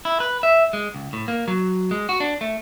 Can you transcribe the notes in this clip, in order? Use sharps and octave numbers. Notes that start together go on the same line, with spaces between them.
E4
B4
E5
G#3
C#2
A2
A#3
F#3
G#3
F#4
D4
A3